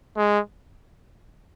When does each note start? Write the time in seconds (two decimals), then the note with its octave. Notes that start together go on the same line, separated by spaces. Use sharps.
0.17 G#3